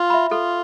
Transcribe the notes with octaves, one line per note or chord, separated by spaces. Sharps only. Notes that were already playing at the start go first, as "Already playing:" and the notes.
Already playing: F4
E5 B5
F4 A4